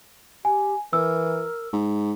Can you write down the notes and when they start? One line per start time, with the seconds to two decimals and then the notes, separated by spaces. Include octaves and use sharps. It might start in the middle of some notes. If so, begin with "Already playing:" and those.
0.45 G4 G#5
0.93 E3 A#4 E6
1.73 G#2